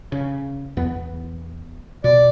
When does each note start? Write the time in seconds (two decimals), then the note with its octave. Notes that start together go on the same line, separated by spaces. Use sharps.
0.12 C#3
0.77 E2 B3
2.04 B2 D5